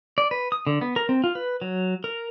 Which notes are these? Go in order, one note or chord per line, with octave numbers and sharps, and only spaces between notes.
D5
B4
D#6
D3
B3
A#4
C4
F4
B4
F#3
A#4